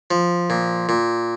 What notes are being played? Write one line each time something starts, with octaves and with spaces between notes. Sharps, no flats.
F3
A#2
A#2